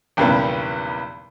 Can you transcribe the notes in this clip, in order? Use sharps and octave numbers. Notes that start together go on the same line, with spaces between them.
B1 E2 G2 C#3 A#3 B3